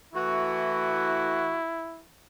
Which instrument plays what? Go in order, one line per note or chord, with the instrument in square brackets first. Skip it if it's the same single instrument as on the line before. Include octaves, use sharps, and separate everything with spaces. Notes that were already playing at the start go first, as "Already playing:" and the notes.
[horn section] E3 A3 F#4 [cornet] E4